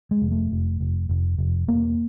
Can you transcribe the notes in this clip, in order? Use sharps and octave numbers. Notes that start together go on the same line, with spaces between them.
G#3
F1
A3
F1
F1
F1
F1
E1 A#3